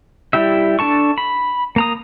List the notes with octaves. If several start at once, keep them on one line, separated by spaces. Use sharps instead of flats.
G3 E4 G4 E5
D4 A4 A5 C#6
B5
A#3 A#5 D#6